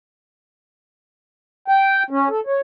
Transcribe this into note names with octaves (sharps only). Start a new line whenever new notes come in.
G5
C#4
A4
C#5